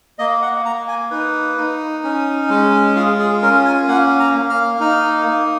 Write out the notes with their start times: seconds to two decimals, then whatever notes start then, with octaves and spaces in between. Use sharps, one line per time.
0.19 A#3 D#5
0.42 F#5
0.65 A#3 A#5
0.88 G#5
1.11 D#4 B4
1.57 D#4
2.04 C#4
2.50 G#3
2.96 F4 G#4
3.19 G#4
3.42 C#4 A#4
3.65 G#5
3.88 A#3 F#5
4.19 A#5
4.35 A#3
4.50 F6
4.80 D#4 F6
5.27 A#3